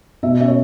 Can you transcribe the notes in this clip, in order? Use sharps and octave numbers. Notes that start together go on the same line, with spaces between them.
B2 E5
C#4 E5
C#5